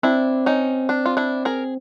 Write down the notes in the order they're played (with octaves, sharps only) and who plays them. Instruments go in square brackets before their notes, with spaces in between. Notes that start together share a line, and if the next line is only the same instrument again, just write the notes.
[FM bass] C4 [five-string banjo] D4 E4
[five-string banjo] C#4 D#4
D4
F4
D4 E4
G#4 A#4